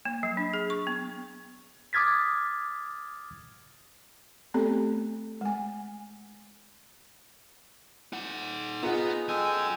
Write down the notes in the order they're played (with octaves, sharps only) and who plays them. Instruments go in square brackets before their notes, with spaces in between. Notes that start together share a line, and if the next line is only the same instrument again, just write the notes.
[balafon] A#3
F#3
D4
G#4
C#6
B3
[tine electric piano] D6 D#6 F6 G#6 A6 B6
[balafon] A3 B3 C4 G4 A4
G#3 G#5
[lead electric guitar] D#4 F#5
[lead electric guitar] B3 [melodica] D#4 A#5 [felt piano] F4 G#4 F#5
[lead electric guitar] F#2 G#5 [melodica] G#3 A4 G5